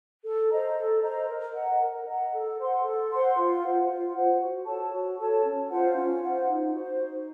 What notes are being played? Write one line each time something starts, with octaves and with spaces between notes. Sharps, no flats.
A4
C5 D#5 A#5
A4
C5 D#5 A#5
A#4
D#5 F#5 A#5
A#4
D#5 F#5 A#5
A4
C5 F#5 C6
A4
C5 F#5 C6
F4
C5 F#5
F4
C5 F#5
F#4
A4 C#5 A5
F#4
A4 C#5 A5
C#4
F4 C5 F#5
C#4
F4 C5 F#5
D#4
F#4 C5
D#4